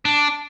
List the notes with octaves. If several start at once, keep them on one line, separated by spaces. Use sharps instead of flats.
D4